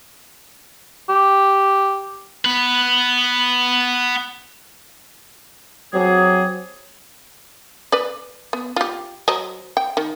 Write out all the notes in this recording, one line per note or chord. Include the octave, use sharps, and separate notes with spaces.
G4
B3 B4
F#3 C4 G4 G#4
B4 D5
B3
F4 G4
F#3 C5 D#5
G5
D#3